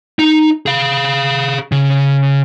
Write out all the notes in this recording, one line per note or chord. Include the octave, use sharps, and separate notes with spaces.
D#4
G#4 F5
C#3